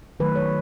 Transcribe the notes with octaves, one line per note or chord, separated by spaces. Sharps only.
D#3 F#3 A3 B4
C#5